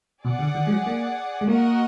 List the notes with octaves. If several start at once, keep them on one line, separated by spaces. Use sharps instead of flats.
B2 G#4 D5 F#5
D3
D#3
G#3
F#3
A#3
G#3
A#3 F#4 A#4 D#5 F#5